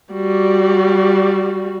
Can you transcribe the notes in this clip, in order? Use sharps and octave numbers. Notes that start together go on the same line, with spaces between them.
G3 F#4